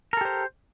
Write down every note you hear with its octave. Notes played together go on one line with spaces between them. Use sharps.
G4 A4 A#4 C5